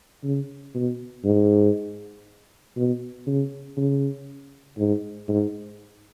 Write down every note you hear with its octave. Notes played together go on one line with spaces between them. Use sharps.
C#3
B2
G#2
B2
C#3
C#3
G#2
G#2